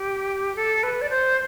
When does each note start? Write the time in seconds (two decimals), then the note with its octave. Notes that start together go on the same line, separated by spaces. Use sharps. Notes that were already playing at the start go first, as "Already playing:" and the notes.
Already playing: G4
0.56 A4
0.83 B4
1.02 D5
1.10 C5